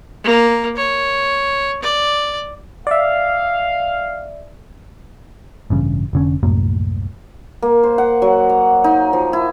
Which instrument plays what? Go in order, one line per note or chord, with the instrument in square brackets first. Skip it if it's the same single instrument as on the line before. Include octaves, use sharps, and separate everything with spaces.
[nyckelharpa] A#3 A#4
C#5
D5
[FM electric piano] D5 E5 [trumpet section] F5
[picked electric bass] A1 G2 C#3
F1 D3 C#4
C2 F#2 A2 A#3
[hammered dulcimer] A#3
C5
F#5
F#3
A#5
D#4
F3
E4